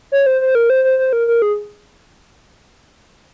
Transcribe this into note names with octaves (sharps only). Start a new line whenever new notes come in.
C#5
C5
C5
A#4
C5
C5
C5
A#4
A#4
G#4